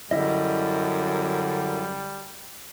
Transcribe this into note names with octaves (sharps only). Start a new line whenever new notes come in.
F#2 D3 G3 E4 D#5